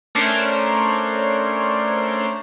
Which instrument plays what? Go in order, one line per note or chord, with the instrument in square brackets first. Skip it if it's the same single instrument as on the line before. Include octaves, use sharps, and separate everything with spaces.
[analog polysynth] A3 C#4 D4 A#4 C5 C#5